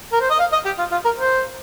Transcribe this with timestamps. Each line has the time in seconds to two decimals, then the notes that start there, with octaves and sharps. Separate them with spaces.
0.12 A#4
0.21 C5
0.30 D#5
0.39 F5
0.53 D#5
0.65 G4
0.78 F4
0.92 F4
1.05 A#4
1.18 C5